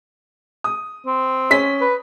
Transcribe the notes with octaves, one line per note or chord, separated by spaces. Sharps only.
D#6
C4
C#4 B6
B4